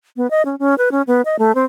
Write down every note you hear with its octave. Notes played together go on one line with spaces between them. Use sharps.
B3
D#5
C#4
C#4
B4
C#4
B3
D#5
A3
C4